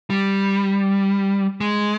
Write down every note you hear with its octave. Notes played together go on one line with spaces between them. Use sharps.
G3
G#3